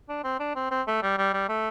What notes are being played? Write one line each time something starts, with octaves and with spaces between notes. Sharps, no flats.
D4
C4
D4
C4
C4
A3
G3
G3
G3
A3